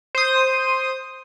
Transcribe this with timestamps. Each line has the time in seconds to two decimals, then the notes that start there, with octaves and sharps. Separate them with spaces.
0.15 C5 D#6